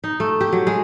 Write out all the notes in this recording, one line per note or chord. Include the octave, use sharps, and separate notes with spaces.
D#4
A3
G4
F#3
G#3